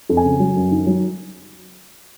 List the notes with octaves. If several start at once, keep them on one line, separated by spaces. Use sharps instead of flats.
F2
G#5
C#3
F#3
F#2
D#3
F#3